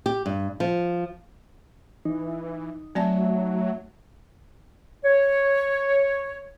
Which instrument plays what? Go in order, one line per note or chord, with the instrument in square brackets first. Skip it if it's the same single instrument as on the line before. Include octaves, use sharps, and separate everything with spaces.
[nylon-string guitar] G4
G2
F3
[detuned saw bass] E3 [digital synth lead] D#4
[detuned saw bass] F#3 [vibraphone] A3 E5 [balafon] C4 D5 A5
[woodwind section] C#5